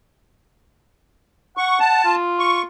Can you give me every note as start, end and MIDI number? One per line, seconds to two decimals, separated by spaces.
1.57 2.03 78
1.57 1.79 85
1.80 2.15 81
2.04 2.64 65
2.39 2.63 85